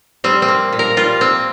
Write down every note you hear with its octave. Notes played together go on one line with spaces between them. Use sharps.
G3 C4
C4
A#3
A#2
A#4
G3 F4
A#3 C4